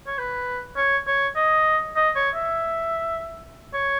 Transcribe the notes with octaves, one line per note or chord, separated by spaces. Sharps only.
C#5
B4
C#5
C#5
D#5
D#5
C#5
E5
C#5